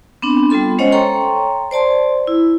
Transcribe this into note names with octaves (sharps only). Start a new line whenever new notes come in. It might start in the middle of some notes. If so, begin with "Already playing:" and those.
B3 C4 D4
G3 B3 F4 A4 C6
G#3 C#4 C5 C#5 D#5 F#5
A4 C#5 G5 A#5 C6 C#6
C5 D5 A5 C6
E4